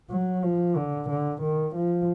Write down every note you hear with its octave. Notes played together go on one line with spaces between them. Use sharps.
F#3
F3
D3
D3
D#3
F3